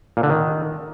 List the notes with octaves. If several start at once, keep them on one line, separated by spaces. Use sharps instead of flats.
A#2
D3
D#3